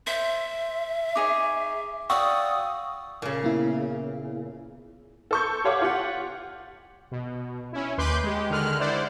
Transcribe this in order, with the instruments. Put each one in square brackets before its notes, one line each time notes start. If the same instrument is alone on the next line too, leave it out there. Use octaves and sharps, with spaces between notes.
[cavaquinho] C5 [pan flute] E5
[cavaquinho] D#4 G#4 C#5 [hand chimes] D6
[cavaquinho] F#4 D5 [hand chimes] F5 G5 E6 [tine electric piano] C#6 [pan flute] D#6
[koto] A#2 C#3
[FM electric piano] A#3 B3 E4
[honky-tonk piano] A4 C#6 G6
G4 C#5 F5 F#5 D6
F4 G4 F#5
[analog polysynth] B2
C#4 E4
D#2 B4 C6 D6 G6
G#3 G4
D3 D#3 G#3 F6 F#6
E4 C5 D5 F#5